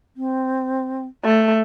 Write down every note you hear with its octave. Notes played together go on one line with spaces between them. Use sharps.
C4
A3